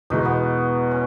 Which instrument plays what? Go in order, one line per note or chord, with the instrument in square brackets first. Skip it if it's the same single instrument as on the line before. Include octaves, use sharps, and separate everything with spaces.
[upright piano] E2 B2 G#3 [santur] D#4
[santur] B3
C#4